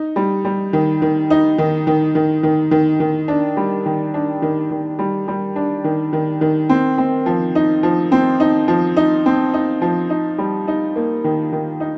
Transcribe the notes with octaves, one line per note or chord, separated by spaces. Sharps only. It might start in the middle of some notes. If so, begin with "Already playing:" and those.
Already playing: D#4
G3
G3
D#3
D#3
D#4
D#3
D#3
D#3
D#3
D#3
D#3
D4
G3
D#3
D4
D#3
D#3
G3
G3
D4
D#3
D#3
D#3
C4
C4
F3
D#4
F3
C4
D#4
F3
D#4
C4
D#4
F3
D#4
G3
D#4
A#3
D#3
D#3
D#4